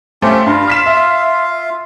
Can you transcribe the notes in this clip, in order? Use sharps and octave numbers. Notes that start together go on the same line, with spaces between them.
A3 C4 C#4 F4 G4
G2 F4 F5
F6 B6 E7
E5